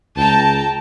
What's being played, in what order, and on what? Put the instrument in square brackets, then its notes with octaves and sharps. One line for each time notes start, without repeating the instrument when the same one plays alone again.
[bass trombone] C#2 [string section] G5 A5 A#5